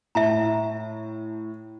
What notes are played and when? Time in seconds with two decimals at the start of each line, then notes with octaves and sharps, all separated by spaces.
0.15 A2 E5 A5 A#5